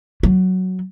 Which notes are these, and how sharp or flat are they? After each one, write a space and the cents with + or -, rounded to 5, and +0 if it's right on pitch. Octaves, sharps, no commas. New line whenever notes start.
F#3 +5